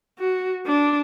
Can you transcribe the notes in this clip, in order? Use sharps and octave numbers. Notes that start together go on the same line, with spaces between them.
F#4
D4